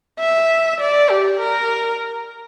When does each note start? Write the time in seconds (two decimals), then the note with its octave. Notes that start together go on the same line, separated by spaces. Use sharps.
0.20 E5
0.80 D5
1.10 G4
1.39 A#4